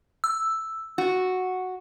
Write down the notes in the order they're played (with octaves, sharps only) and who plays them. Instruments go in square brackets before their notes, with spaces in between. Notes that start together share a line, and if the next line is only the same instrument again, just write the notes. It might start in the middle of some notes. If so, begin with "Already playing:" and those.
[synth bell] E6
[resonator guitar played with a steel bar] F#4